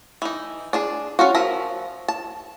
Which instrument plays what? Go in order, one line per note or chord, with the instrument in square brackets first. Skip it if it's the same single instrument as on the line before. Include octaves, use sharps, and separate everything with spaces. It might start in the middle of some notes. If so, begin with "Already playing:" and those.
[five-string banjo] E3 D#4
D4 G#4 A5
C#4 F4 F#4
F3 A#4 E5 A#5
A5